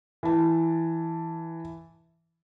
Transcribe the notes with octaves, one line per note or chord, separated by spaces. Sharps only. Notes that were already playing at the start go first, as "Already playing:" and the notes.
E3 A5